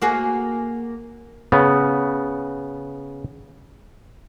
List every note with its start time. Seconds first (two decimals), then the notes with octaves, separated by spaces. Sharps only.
0.02 A#3 F#4 G#4
1.52 C#3 B3